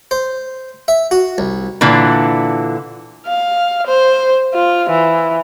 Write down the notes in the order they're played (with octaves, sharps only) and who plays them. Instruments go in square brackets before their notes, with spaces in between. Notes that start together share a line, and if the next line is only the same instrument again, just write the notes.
[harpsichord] C5
E5
F#4
C2
[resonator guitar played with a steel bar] A#2 D3 E3
[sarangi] F5
C5
F4
E3